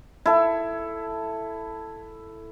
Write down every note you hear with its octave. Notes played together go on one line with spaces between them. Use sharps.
E4 A4